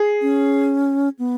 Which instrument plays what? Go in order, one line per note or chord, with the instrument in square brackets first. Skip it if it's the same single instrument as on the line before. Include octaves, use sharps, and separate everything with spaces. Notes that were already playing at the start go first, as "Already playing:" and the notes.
Already playing: [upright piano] G#4
[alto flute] C#4
B3